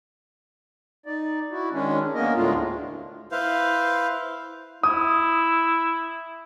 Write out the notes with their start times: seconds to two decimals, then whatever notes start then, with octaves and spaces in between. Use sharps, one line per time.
1.06 D#4 D5
1.51 E4 F#4
1.72 D#3 G#3 C#4 D4
2.14 A#3 B3 C#4 A#4 D#5
2.34 D2 A2 G#3 A3 D4 F4
3.32 E4 B4 C5 F5
4.83 E4 D#6